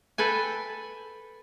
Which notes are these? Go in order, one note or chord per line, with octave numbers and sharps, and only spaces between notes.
A4 B4 G5 G#5